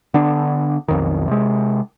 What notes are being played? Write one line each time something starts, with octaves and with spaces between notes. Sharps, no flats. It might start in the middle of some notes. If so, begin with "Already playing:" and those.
D3 B3 D4
B1 F2 D#3
C3 G#3